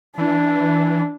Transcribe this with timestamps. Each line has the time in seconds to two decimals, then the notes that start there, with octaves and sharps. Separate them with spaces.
0.18 E3 D4